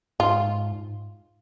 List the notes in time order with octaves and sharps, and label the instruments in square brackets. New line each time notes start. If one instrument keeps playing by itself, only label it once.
[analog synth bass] G#2 [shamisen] F4